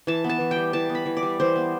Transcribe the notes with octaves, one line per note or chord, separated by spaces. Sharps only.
E3 A5
B3
A5
E3
G5
G3
E3 A5
B3
B5
E3
D5
G3
E3 C5
B3